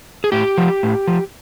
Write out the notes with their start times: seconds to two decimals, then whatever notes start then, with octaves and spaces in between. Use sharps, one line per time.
0.24 G#4
0.32 A2 G4
0.58 F3
0.83 A2
1.08 F3